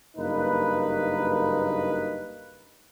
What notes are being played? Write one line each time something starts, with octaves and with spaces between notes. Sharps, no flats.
F#1 G2 A#3 D#4 B4